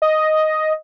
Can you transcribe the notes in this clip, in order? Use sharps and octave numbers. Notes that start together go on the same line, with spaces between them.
D#5